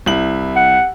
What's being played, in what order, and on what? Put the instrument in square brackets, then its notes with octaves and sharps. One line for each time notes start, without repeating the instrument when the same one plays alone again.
[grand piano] C2 E4 F#7
[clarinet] F#5